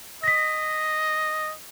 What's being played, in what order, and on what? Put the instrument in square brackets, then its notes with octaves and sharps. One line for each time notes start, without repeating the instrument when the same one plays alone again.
[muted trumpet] D#5 [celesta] A#6 B6